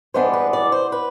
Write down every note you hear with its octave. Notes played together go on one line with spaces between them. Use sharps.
G2 E3 G#3 B3 D4 C5
B4
D5
C5
B4